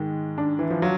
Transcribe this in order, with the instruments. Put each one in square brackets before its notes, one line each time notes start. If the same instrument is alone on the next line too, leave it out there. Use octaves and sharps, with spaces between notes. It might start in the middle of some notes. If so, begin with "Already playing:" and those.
Already playing: [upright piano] G#2 G#3 [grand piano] D#3
[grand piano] D4
[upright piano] E3
F3
[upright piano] F#3 [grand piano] F4